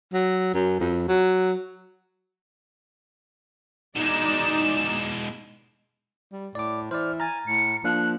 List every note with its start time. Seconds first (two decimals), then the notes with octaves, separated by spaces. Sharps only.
0.13 F#3
0.54 F#2
0.80 F2
1.08 F#3
3.95 B2 G#3 D#4 D5 E7
6.32 G3
6.55 A2 D5 D6
6.91 E3 C5 D5 F6
7.20 G#5 A#5 F6 A6
7.47 A2 C#7
7.84 F3 A#3 D4 F5 F#6